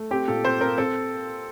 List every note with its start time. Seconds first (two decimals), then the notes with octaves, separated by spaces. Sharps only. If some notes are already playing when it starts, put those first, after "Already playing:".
Already playing: A3
0.11 C4 G4
0.28 A#2 A4
0.44 C4 C5
0.61 C4 A#4
0.78 C4 A4